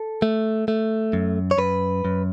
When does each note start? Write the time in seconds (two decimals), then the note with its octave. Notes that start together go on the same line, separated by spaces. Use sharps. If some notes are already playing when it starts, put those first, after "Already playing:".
Already playing: A4
0.22 A3
0.68 A3
1.13 F#2
1.51 C#5
1.58 F#2 B4
2.05 F#2